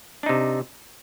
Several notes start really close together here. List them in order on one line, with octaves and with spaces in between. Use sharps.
D4 D#4 C3